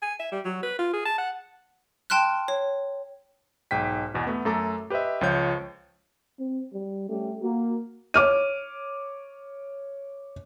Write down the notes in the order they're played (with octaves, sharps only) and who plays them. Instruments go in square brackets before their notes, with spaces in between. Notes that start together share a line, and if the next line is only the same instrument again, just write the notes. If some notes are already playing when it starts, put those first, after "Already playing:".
[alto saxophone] G#5
E5
G3
F#3
B4
F4
G#4
A5
F#5
[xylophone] G5 A5 C6 F6 F#6
C#5
[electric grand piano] B1 G#2 G5 B6
E2 B2 F#4
A3 B3
F#2 A3 A4 A#5 D6
G4 B4 C5 D#5 E5
C#2 F3 C#5 G6
[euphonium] C4
G3
[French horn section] G3 C#4 G4 [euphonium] A3
[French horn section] A#3 [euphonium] F#4
[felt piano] C#5 D6 F6 D#7